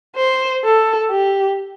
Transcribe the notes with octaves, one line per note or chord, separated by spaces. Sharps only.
C5
A4
G4